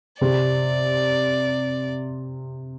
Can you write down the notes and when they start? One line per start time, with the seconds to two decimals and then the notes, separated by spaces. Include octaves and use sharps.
0.20 C3 C4 D5